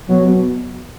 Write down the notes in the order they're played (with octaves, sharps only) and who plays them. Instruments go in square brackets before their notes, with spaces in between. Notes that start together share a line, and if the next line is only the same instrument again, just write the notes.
[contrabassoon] B2 [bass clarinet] F#3
[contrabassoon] B2